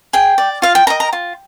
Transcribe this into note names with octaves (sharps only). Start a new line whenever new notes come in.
G#4 G5
D5
F4 F5
G5
A#4 D#5 A#5
A#5
F4